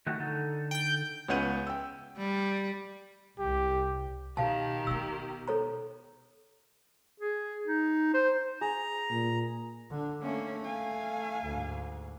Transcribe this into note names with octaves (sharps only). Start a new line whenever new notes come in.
D#3 A3 F#4
D3 D#4 A4
G5 G6
C#2 B3 C#4 F#5 G6 D#7
G5 E6
G3
C2 G4
B2 D#3 G4 F5 A5
B2 B3 E6
A4 C#5 A#5
G#4
D#4
C5
G#4 A#5
A#2
D3 D4
A3 A#3 C#4
F5 G#5
D2 G#2